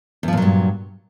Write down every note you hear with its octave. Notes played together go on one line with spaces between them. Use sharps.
E2 G2 A#2 F3 F#3